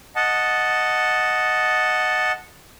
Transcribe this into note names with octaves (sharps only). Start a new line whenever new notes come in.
D#5 F#5 A5